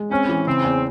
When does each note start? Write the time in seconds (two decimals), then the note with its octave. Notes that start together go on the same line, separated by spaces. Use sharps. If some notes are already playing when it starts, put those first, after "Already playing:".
Already playing: G#3
0.11 C4 C#4
0.29 E3
0.46 C#3 C4
0.64 E2